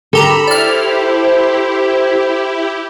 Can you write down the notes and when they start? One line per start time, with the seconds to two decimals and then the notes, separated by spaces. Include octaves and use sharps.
0.13 D3 G4 A4 A#5 B5
0.47 E4 G4 C5 D5 F6